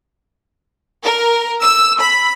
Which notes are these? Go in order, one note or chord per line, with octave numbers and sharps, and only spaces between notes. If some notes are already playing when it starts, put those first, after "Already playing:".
A#4
E6
B5